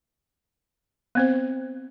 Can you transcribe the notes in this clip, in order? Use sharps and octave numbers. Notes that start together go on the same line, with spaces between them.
B3 C4 C5